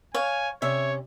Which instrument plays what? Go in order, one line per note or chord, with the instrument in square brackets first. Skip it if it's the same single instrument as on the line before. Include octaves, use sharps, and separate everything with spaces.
[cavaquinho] C#5 F5 [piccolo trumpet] G#5
[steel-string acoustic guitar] C3 C#4 [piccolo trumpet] C#5 [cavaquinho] E5